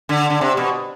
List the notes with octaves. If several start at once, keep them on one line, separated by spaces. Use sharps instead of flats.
D3
D3
C3
B2